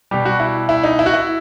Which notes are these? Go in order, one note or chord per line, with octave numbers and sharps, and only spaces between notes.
B2 G3 G4
F#4
E4
E4
D#4
E4
F#4
E4